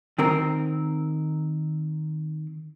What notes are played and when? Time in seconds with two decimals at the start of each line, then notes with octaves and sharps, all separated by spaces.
0.19 D#3 C4 A#4